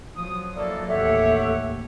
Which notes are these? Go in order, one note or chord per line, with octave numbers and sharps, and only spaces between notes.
F3 F#3 D#6
A#3 E4 A4 D5
A1 D#2 G4 A4 C#5 E5 F#5